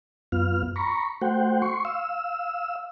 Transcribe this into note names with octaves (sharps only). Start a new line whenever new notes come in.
F#2 B3 F4 F6
A#5 B5 C#6
A3 F#4 C5 F#5 G5
C6 C#6
F5 E6